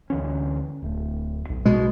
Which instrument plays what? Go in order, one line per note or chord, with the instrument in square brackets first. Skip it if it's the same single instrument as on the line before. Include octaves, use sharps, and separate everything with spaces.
[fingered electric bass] D2 E3 C#4
D1 A3
B1
[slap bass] B2 G#3